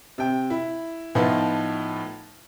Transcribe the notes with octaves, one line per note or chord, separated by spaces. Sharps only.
C3 G5
E4
A2 F3 A3 B3 D#4 F4